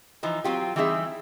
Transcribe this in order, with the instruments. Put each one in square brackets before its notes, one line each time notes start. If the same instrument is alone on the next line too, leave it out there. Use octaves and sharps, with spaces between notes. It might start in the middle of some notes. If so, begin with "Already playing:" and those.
[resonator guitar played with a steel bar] E3 F3 D#4
F#3 C4 F4 G4
E3 G3 C4 D#4 G#4 E5